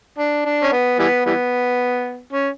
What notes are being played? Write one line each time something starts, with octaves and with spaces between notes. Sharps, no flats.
D4
D4
C#4
B3
E3 G3 B3
E3 G3 B3
C#4